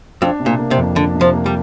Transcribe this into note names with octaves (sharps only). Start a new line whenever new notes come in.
F2 D4
C3
A#2
A#3
C3
F2
D3 D4
C3
F3
A#3
G3